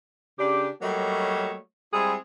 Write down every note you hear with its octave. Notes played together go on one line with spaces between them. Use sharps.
C#3 D4 G4
F#3 G3 A3 A#3 C#5 D#5
G3 G#3 C4 E4 G#4